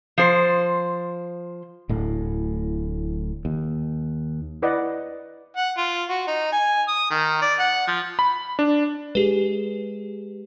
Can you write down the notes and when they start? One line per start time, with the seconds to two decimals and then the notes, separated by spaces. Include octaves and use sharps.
0.18 F3 C5
1.89 D1 A2
3.45 D#2
4.62 E4 B4 D5 D#5 F#5
5.57 F#5
5.77 F4
6.09 F#4
6.27 D#4
6.52 G#5
6.88 D#6
7.11 D#3
7.42 D5
7.60 F#5
7.87 F3
8.19 B5
8.59 D4
9.15 G#3 G4 G#4 B4